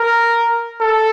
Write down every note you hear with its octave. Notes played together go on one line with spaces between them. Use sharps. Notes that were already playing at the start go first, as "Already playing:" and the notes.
Already playing: A#4
A4